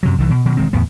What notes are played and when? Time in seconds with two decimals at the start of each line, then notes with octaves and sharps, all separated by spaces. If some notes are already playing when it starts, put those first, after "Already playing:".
0.03 F#2 C3 F#3
0.18 C2 D#3 E3
0.30 B2
0.46 B2 D#3 F#3
0.57 E1 D#3 G#3 C4
0.73 D1 E2 A2 B3